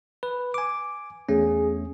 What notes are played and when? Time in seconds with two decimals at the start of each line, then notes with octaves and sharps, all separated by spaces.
0.23 B4
0.54 G#5 D6
1.29 E2 A3 C#4 G#4